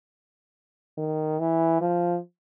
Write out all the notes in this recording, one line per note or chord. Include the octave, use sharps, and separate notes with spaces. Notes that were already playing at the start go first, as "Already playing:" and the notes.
D#3
E3
F3